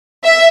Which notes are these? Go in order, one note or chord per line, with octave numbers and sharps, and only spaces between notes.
E5